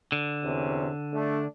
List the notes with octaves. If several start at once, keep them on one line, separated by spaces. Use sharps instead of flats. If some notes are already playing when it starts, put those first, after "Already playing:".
D3
E2 C3 C#4
A3 D4